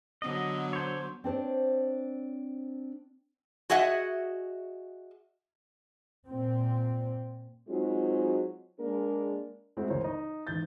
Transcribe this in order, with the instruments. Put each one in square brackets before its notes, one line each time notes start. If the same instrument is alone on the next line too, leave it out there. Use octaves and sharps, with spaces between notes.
[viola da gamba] D3 F#3 B3 [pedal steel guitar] D#5
[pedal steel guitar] C5 C#5
[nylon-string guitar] C4 D4 C5 C#5
[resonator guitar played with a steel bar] F#4 G#4 D#5 E5 F#5
[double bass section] A#2 C4
[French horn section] F#3 G#3 C4 D#4 F4 G#4
G#3 A#3 D4 G#4 A#4
[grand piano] G#3 A3 C4 E4 F#4
G1 C#2 E3 A#4 C5 C#5
D#4
A1 G#2 G6 A6